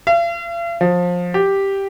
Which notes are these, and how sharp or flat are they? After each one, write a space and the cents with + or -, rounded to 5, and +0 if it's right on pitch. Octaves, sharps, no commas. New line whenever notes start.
F5 -45
F3 +25
G4 +0